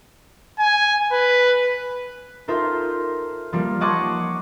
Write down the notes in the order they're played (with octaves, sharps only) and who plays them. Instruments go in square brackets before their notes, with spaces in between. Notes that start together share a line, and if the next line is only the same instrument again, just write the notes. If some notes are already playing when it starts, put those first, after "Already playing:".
[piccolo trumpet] G#5
B4
[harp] D#4 F4 A4 A#4 C5 E5
F3 G3 A#3
C#5 D#5 F#5 A5 C6 D6